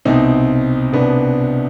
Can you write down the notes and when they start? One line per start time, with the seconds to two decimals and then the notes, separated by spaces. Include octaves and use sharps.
0.05 C2 B2 C4 D#4
0.92 C2 B2 B3 D4